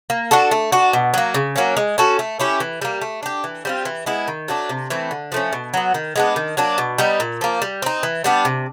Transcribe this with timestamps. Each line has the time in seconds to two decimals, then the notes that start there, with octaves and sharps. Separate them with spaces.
0.10 A#3
0.31 D4 F#4 A4
0.51 A3
0.72 D4 F#4
0.93 B2
1.14 F#3 A#3
1.34 C#3
1.56 F#3 A#3 C#4
1.77 G#3
1.98 C#4 F#4 A4
2.19 A3
2.40 C#4 E4 G4
2.60 E3
2.82 G3 A#3
3.02 A3
3.23 D4 G4
3.44 E3
3.65 G3 C4 F4
3.85 E3
4.06 G#3 B3 E4
4.28 D#3
4.48 F#3 A3 D4
4.69 C3
4.90 E3 A3 C4
5.11 D3
5.32 F3 A3 C#4
5.53 B2
5.74 F#3 B3
5.94 D#3
6.16 G#3 B3 D4
6.36 D#3
6.57 F#3 A#3 D4
6.78 B2
6.98 G3 B3 D#4
7.20 A#2
7.41 F3 A#3
7.62 G3
7.82 C4 D#4
8.03 E3
8.24 G3 B3 D4
8.45 C3